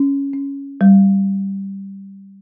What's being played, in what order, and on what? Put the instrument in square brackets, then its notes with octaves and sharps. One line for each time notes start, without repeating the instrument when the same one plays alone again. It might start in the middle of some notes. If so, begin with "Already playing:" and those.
Already playing: [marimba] C#4
C#4
G3